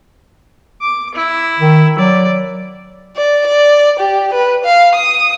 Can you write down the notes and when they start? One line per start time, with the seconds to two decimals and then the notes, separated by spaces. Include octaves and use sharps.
0.81 D6
1.15 E4
1.59 D#3
1.98 F#3 D5
3.17 D5
3.47 D5
3.99 G4
4.33 B4
4.65 F5
4.95 D#6